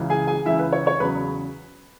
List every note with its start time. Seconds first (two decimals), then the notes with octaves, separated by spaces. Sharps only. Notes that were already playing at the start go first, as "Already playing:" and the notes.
Already playing: C#2 C#3 E3
0.10 G#4 G#5
0.27 G#4 G#5
0.46 C#2 C#3 E3 E4 E5
0.59 B4
0.73 C#5
0.86 C#5 C#6
1.00 E2 C#3 F#3 B4 B5